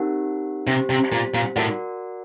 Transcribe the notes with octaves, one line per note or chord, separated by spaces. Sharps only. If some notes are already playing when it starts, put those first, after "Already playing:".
Already playing: C4 D#4 G4 A#4 F#5
C3 C4 G4 C5
C3
A#2
A#2
A2 F#4 A#4 D5 F#5